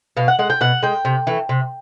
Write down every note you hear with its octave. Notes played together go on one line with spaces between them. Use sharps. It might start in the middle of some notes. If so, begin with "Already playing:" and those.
B2 F5
F#5
G#3 F#5
G5
B2 F#5
G#3 G5
C3
E3 A3
C3